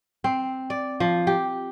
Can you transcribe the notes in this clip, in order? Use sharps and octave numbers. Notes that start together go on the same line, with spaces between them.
C4
D5
F3
G4